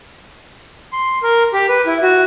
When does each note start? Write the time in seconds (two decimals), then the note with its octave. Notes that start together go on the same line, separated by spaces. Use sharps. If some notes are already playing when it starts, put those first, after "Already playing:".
0.93 C6
1.23 A#4
1.53 G4
1.68 B4
1.86 E4
2.03 F#4